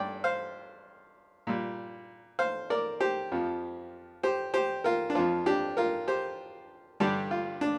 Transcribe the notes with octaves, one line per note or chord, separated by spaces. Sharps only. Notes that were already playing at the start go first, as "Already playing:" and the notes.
Already playing: G2 D5 G5
C5 F5
A#2 G3
C5 F5
A#4 D5
G4 C5
F2 F3
G4 C5
G4 C5
F4 A#4
D4
F2 F3 F4
D4 G4
F4 A#4
G4 C5
G2 D3 G3 D4 G4
F4
D4